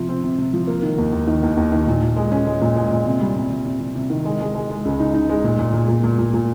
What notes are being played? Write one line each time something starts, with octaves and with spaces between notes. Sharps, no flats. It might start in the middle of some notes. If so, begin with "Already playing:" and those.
Already playing: C3 F3 F4
C4
C3
C3
F3
A#3
D#3
D#2
D#2
D#3
D#2
D#2
D#3
A#2
A#2
G#3
C#4
G#3
A#2
G#3
A#2
C3
G3
C3
C3
C3
C3
C3
D#3
G#3
G#3
G#3
G#3
C#2
D#4
D#4
G#3
A#2
A#2
A#2
A#2
A#2
A#2
A#2